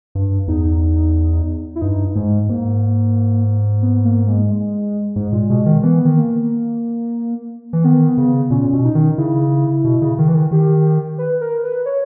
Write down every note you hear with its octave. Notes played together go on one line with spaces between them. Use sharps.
G2
E2 D#4
E4
G2 D#4
G#2 G#3
G#2 A#3
B3
A#3
G#3
G#3
G#2 G#3
A#2
B2 G#3
D#3
E3 B3
D#3
A#3
E3
D#3 B3
C#3
A#2 C#4
B2
D#4
D#3
C#3 E4
B2
C#3
D#3
E3
D#3
D#3 G4
B4
A#4
B4
C#5